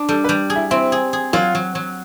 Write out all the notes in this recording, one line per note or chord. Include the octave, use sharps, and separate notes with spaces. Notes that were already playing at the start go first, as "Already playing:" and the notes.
Already playing: D4
G3 A4
B4
G3
G#4
E4
C4 E4
G#4
G#4
F#3 F4
F#3
F#3